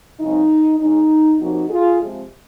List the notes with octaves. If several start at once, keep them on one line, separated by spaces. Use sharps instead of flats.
F#2 C#3 G#3 C4 D#4
C#3 G#3 C#4 D#4
C3 F3 A#3 C#4 D#4 F#4
F4 G#4
C3 F3 G#3